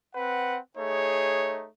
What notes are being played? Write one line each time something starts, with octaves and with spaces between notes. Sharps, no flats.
C4 B4 F#5
A3 D#4 G#4 C#5